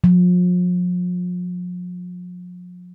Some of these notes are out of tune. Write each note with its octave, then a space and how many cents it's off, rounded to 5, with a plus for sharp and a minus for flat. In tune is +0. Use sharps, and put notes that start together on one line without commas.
F3 +40